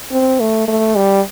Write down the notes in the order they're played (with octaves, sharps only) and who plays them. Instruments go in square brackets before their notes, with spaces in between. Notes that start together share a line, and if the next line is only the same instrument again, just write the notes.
[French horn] C4
A3
A3
G3